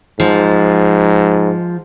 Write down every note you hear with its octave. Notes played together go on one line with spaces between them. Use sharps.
G#2 F3